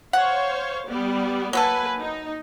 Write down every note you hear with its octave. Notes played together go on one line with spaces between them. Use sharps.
C5 C#5 F5 F#5
G3 B3 D5
F#3 A#3 B3 A4 B4 G#5
D#4